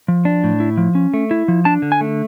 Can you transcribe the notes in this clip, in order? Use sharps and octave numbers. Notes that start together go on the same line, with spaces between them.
F3
D4
A2
E4
F3
C#4
A3
E4
F3
D4 A5
D3
G#5
A3